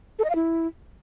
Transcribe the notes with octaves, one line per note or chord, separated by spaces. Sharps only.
A4
D#5
F5
E4